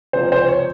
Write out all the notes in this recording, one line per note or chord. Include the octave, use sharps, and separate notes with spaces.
C#2 C3 F3 C5
C5
C#5